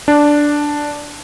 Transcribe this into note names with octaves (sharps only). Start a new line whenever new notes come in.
D4